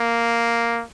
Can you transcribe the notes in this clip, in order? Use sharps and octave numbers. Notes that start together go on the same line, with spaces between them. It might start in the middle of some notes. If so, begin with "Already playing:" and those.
Already playing: A#3